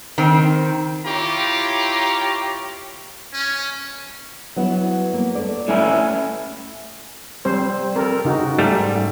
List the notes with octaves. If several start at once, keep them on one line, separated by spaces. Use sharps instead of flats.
D#3 C4
E4 F4 G4 C#5 A#5 D6
C#4
F#3 B3 E4
A#3
A3 D5
A2 C#4 E4
G3 C4 C5
C4 A4 A#4
C#3 D#4 F#4
G#2 G3 A3